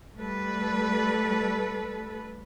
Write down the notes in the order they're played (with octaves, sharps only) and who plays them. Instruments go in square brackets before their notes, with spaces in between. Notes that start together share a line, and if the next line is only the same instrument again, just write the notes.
[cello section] G3 A3 A4 B4